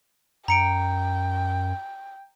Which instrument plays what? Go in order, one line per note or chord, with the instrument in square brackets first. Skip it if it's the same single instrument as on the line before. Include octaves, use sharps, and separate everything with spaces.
[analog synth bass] F#2 [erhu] G5 [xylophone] A#5 C#7 D7